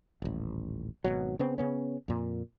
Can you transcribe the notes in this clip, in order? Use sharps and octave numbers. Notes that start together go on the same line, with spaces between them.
D#1 A1
G#1 B2 F#3
C#3 B3 C4
C#3 B3 C#4
F2 A#2